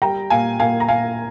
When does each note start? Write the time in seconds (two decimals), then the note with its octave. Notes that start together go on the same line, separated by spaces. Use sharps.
0.02 G3 G5 A#5
0.30 A#2 F5 G#5
0.59 A#2 F5 G#5
0.80 A#5
0.88 A#2 F5 G#5